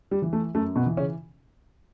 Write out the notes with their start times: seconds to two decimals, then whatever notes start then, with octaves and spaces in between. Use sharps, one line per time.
0.11 G3
0.22 E3
0.33 A3
0.54 F#2 A3
0.75 B2 B3
0.86 E3
0.97 C#3 C#4